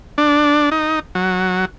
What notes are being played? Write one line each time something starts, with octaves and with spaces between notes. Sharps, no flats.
D4
D#4
F#3